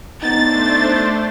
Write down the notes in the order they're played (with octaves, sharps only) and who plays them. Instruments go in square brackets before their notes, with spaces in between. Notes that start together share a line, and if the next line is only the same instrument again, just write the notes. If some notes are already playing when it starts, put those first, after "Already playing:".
[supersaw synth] A3 D4 C5 [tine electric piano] B3 D#4 [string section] A6